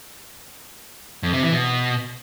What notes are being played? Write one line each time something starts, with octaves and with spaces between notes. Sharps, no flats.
F2
C3
E3
B2